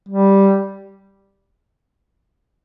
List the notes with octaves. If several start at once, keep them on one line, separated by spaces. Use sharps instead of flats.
G3